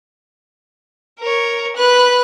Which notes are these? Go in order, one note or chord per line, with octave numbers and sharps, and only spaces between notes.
A#4 C#5
B4 F#6